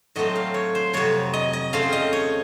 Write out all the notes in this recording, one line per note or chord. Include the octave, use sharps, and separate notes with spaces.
A2 F#3 A3 C4 D#5
F5
C#5
C5
F2 C3 F#3 C#5
D#5
D#5
C#3 A3 C4 F5
D#5
C#5